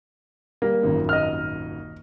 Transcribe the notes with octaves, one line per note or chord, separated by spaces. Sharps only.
G3 A#3
D#1 G#1 F#2
D#5 F6